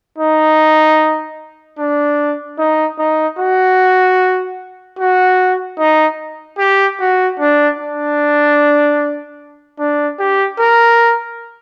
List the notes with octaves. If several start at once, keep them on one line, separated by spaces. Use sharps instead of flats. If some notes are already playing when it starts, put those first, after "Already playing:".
D#4
D4
D#4
D#4
F#4
F#4
D#4
G4
F#4
D4
D4
D4
G4
A#4